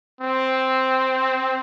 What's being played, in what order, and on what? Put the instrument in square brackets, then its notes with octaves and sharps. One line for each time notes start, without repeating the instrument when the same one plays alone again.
[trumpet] C4